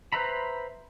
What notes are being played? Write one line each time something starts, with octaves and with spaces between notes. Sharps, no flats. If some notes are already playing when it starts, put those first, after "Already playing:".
B4 C5 E5 A#5 B5